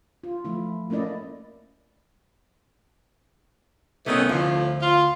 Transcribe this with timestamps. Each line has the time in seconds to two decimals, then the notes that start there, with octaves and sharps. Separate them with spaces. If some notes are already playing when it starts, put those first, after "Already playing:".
0.24 F4
0.45 F3 A3 E4
0.90 A3 A#3 C#4 E4 D5 D#5
4.06 C2 D#3 E3 A3 B3 C#4
4.29 D2 A2 F3
4.81 F4